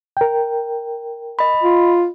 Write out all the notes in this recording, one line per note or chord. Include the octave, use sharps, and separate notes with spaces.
A#4 G5
D#5 B5
F4